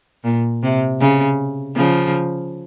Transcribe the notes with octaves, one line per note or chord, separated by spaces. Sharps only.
A#2
C3
C#3
C#3 F3